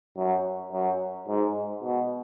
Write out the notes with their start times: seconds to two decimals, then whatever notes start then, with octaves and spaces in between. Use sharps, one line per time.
0.17 F#2
0.72 F#2
1.28 G#2
1.83 B2